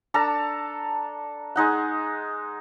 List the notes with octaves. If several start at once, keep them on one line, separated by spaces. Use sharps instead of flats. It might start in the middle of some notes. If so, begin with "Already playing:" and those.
D4 A4 A5 A#5
G#3 D#4 F#5